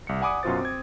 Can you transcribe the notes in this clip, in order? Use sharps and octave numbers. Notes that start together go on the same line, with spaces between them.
C2 C#7
D5 F#5 G#5 B5 D6 D#6
F#2 B2 F4 F#4 C5 A6
C4 G#6